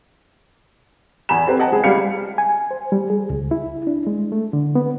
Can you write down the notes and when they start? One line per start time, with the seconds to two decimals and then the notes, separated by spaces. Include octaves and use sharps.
1.29 E2 G#5 B5 E7
1.47 C4 G4 A4 B4 C5
1.59 D#5 F#5 G5 A5
1.72 C#2 G#4
1.84 C#2 G3 F5 C#7
2.38 G#5
2.71 C5
2.92 G3
3.10 G#4
3.30 C#2
3.51 E4
3.87 D4
4.07 G#3
4.32 A3
4.53 D3
4.75 B3